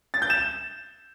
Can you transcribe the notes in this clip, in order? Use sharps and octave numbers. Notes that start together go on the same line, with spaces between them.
A6
G6
E7